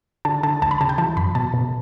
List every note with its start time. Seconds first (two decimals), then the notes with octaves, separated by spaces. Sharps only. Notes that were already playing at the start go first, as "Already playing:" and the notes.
0.25 D3 A5
0.43 D3 A5
0.62 D2 A5
0.71 B5
0.81 C#3 A5
0.89 G5
0.98 E3 A5
1.17 F#2 B5
1.35 B2 A5
1.54 B2